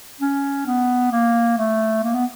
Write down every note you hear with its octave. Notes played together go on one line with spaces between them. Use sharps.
C#4
B3
A#3
A3
A#3
B3